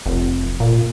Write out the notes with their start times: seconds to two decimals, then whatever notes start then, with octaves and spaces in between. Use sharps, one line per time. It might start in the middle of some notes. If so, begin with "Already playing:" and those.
0.06 F1
0.60 A#2